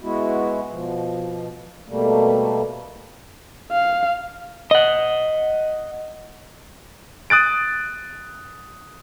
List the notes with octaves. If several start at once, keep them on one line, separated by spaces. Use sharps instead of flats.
G#3 B3 E4 F#4
B2 F3
B2 G3 A3 A#3
F5
D#5 F#5
D#6 F#6 A6 D7